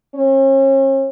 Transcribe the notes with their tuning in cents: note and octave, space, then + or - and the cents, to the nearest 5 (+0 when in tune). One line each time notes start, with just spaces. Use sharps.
C#4 -40